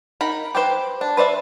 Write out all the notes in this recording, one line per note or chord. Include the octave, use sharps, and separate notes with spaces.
D#4 A#4 B5
G4 B4 C5
D4
B4 C5 D5 E5